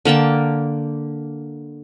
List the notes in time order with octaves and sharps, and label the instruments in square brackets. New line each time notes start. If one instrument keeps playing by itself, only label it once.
[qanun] D3 A#3 G5 A5